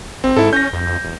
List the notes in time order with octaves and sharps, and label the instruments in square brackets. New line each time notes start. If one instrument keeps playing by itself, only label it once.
[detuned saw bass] G#1 [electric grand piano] C4
[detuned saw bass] G#2 [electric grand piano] E4 A4
[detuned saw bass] C#4 [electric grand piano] G6 A#6
[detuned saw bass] F2
E1